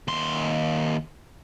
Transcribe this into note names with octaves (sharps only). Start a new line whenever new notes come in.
D#2 C6